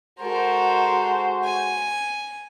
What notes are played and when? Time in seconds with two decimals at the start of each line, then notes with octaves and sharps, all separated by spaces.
0.19 G#3 F#4 A4 A#4 C5
1.45 G#5